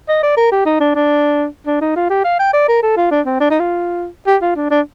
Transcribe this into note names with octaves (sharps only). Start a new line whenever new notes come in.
D#5
D5
A#4
G4
D#4
D4
D4
D4
D#4
F4
G4
F5
G5
D5
A#4
A4
F4
D4
C4
D4
D#4
F4
G4
F4
D4
D4